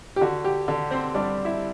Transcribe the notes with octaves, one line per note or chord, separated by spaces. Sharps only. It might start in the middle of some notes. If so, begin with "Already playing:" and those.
G4
D3 F#4
G4
D3
C4 C5
G3 D4 D5
E4 E5